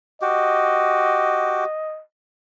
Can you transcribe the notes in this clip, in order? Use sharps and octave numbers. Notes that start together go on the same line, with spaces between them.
F#4 G4 D#5